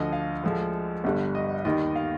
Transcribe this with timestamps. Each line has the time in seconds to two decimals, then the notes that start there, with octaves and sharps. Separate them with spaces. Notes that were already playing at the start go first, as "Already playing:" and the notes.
Already playing: D2 D3 F3 D#5
0.13 F5
0.43 D2 D3 F3 G#3
1.04 G1 G2 D3 G3
1.35 D#5
1.65 D#2 D#3 G3 D#5
1.95 F5